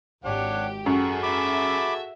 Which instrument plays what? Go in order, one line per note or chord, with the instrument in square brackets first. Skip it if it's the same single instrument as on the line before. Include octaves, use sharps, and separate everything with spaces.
[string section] G#1 G4 [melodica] D4 [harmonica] C#5 F#5
[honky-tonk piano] F#2 [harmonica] F#4 G#4 A4 [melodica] C#6
[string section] E5 [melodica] B5 D6